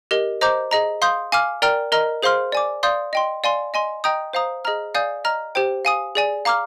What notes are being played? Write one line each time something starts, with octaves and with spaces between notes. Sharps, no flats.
G4 A#4 D#5
C5 D#5 A#5 D6 G6
G#4 D#5 A#5
F5 C6 D#6 G6
F5 G#5 D6 F6
A#4 D5 G5 A#5 F6
A#4 D#5 A#5 F6
G#4 C5 F5 C6 F6
D5 G#5 D6
D5 F5 C6 D#6 G6
D#5 G5 C6
D5 F5 G#5 C6
D#5 G#5 C6
D#5 G5 A#5 D#6 G6
C5 F5 A#5 D#6
G#4 D#5 A#5 F6
D5 F5 G#5 D#6 G6
D#5 A#5 F6
G4 C5 G5
F5 G#5 D#6
G#4 D5 G#5
F5 A#5 D6 F6